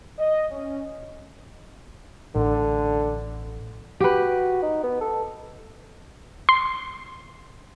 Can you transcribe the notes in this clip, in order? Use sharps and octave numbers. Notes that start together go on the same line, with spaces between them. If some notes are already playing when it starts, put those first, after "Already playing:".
D#5
C#4
A1 D3
F#4 G4 B4
D#4
B3
A4
C6